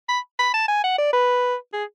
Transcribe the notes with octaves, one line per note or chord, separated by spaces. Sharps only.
B5
B5
A5
G#5
F#5
D5
B4
G#4